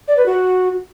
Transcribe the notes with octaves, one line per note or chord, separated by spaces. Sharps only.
D5
B4
F#4